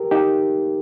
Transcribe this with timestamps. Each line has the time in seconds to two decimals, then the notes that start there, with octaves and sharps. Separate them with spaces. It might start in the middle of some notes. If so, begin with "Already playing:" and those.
Already playing: G4 A#4
0.11 D#4 G4